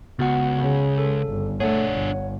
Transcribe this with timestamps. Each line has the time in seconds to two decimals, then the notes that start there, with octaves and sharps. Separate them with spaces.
0.19 C#2 B3 F#4 F#5
0.57 C#3
0.98 A4
1.27 G1
1.60 A3 D4 G#4 C#5 F#5
1.92 G1